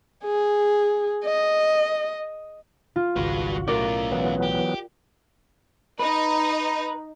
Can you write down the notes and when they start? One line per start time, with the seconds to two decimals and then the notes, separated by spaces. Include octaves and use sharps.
0.24 G#4
1.25 D#5
2.96 F4
3.16 G#1 C#2 G3 F#4 B4
3.68 B1 A2 C#4 F4 A#4 D5
4.12 E3 F#3 B3
4.43 G4
5.99 D#4 B4